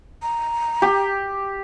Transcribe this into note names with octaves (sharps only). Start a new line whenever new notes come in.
A#5
G4